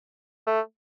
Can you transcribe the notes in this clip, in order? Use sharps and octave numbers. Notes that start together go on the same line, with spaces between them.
A3